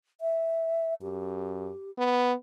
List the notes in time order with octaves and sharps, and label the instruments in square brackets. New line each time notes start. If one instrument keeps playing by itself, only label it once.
[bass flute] E5
[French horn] F#2 [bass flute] G4
[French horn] B3